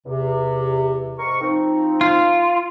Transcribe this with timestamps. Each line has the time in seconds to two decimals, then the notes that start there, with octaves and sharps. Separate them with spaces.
0.05 E2 C3
1.19 G#2 A#4 C#6
1.41 F3 C4 D#4
2.01 F4